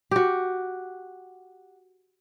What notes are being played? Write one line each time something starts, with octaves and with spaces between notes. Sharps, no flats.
F#4 G4